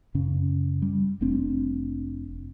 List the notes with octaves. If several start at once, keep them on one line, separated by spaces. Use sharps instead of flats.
F#2 C#3 C#4
G3
F1 A3 C4 D4